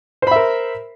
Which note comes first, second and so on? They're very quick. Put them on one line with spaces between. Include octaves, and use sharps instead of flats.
C5 B5 E5 A#4